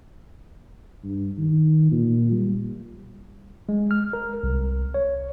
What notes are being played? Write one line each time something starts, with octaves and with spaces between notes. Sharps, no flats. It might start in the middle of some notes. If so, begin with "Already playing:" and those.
G2
D#3
A#2
G3
G#3
F6
A#4
C2
C#5